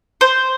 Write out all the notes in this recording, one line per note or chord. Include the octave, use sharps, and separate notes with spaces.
C5